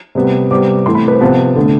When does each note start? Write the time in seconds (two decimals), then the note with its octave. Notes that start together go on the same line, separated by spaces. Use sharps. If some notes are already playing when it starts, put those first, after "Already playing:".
0.15 C3 G3 B3
0.51 C3 G3 B3 D6
0.86 C3 E3 A3 C6
0.94 B5
1.08 B4
1.12 C5
1.21 C3 F3 B3 A5
1.56 D3 A3